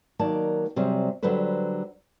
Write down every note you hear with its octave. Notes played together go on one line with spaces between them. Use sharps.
D#3 F#3 A#3 D5 A5
C3 F#3 G3 G#4 C5
D3 F#3 G3 F#4 B4 C5